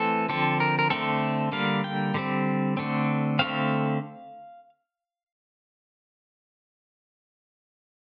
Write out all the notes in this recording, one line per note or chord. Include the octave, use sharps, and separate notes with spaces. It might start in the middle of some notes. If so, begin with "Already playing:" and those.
Already playing: E3 A3 C4 A4
D3 F3 C4 A4
A#4
A#4
D3 A3 C4 A4
D3 G3 A#3 F5
G5
D3 G3 C4
D3 A3 C4
D3 A3 C4 F5